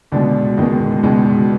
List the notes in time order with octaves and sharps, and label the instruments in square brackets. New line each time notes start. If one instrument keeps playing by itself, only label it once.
[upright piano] C#2 B2 D3 G#3 D4
C#2 B2 D#3 G#3 D#4
C#2 B2 G#3